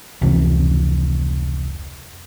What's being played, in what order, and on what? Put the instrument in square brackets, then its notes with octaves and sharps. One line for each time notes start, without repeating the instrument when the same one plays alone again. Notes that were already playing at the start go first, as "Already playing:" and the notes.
[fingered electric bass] F1 C#2 C3 E3